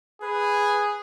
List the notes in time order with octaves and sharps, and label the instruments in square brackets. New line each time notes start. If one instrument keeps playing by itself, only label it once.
[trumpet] G#4 [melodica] B4